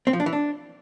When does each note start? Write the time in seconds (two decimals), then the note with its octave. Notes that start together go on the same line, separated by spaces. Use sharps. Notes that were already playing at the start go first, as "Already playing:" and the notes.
0.07 C4
0.13 F3
0.20 D4
0.26 E3
0.33 D4